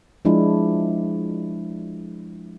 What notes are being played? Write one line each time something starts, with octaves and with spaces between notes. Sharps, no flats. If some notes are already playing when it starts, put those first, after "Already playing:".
F3 G#3 D4 E4